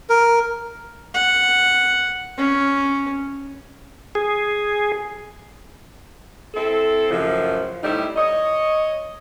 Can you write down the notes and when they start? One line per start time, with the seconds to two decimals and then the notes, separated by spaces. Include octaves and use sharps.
0.10 A#4
1.15 F#5
2.38 C#4
4.15 G#4
6.54 C4 E4 A4
7.11 F#2 A2 C#3 F3
7.83 A2 C3 G3 D#4 E4
8.17 C#5 D#5